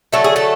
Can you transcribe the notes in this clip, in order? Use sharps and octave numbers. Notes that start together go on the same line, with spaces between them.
D3 F#3 A3 A4
G#4
A3 A4